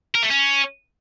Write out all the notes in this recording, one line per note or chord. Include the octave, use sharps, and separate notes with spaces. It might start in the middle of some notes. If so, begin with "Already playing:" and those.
A#4
A3
C#4